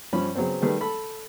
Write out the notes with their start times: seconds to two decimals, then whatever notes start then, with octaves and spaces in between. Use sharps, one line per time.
0.13 G2 F3 C#4 B5
0.35 C#3 F#3 B3 C4
0.62 D#3 G3 A3 G#4 B4
0.81 A4 B5